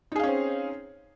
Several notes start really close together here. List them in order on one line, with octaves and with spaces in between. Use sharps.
D#4 G#4 F5 C#4 C4